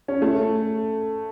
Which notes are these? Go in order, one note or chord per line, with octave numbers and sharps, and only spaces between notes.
C#4
A3